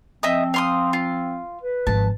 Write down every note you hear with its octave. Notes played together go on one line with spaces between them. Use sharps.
F3 C4 D#5 E5 D#6
F5 C6 D#6
F4
B4
G#1 F3 A5